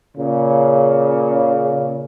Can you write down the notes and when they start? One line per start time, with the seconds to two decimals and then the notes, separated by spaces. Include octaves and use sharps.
0.17 A#2 C#3